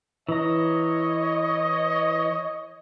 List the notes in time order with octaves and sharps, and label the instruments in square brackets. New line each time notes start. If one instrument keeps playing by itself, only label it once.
[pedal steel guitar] E3 A#5 [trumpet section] C#5 D#5